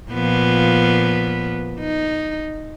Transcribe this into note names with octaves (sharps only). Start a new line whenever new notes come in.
A#2 F3 B3
D#4